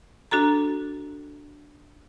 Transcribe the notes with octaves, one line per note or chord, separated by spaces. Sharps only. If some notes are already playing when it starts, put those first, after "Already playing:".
D4 F#4 A4 A#5